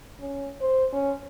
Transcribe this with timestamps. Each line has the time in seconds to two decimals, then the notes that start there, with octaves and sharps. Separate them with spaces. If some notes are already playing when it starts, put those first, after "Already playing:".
0.20 C#4
0.61 C5
0.92 C#4